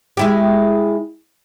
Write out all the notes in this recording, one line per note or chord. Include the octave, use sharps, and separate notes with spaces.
G#3 E4 G4